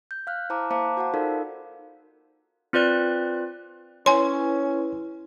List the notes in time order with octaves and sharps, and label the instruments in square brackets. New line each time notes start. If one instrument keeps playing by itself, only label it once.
[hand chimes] G6
F5 F6 F#6
E4 C5 F5 A5 A#5 D6
A#3 C5 F5 A5 A#5 D6
F#4 C5 F5 F#5 A5
D#4 F4 A4 A#4 D5 F5
[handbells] C4 F4 B4 D5 F#6
[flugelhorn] C#4 [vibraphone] E4 B4 [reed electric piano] C#5 [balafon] G#5 C6